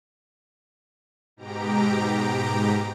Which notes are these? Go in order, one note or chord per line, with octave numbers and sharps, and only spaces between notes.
G#2 B2 G4 A#5 D7